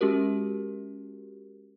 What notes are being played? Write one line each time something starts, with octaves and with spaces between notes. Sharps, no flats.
G#3 C#4 F#4 G4 A#4